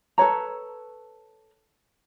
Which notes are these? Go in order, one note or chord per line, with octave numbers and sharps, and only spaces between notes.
A4 B4 C#5 A#5